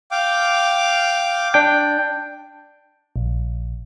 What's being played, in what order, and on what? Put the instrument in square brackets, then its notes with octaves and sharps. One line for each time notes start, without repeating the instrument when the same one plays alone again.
[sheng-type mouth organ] F5 G5 D6
[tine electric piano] D4 G5
[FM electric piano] A#1